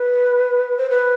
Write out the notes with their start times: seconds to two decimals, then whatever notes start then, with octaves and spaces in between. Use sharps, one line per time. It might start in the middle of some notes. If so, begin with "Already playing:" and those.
Already playing: B4
0.78 C5
0.90 B4